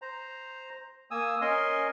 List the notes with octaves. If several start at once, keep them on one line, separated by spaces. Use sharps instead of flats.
C5 A#5
A#3 G#5 D#6 E6
C#4 A#4 D#5 G#5 C6